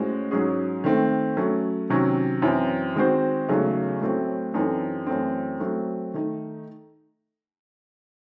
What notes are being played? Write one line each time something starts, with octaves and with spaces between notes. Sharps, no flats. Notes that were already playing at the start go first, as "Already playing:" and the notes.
Already playing: A2 G#3 C#4 F#4 C5
G#2 F#3 C#4 G#4
D#3 A3 C4
F#3 A3 C#4
C3 D#3 F#3 C#4
F#2 E3 C4 E4
D#3 G#3 C4 F#4 C5
E2 C#3 F#3 A3 D#4
A2 F#3 A3 C4
F#2 E3 C4 D#4 A4
F#2 E3 A3 C4
F#3 A3 C4
D#3 A3 D#4